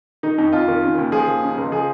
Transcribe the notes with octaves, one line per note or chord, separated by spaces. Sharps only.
D#3 D#4
F2 D#4
F2 F4
D#3
C#3
D#2
F3 G#4
D#2
C#3
C#2
F3 G#4